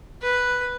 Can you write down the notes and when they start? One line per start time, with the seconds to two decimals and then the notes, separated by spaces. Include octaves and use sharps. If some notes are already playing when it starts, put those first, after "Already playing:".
0.22 B4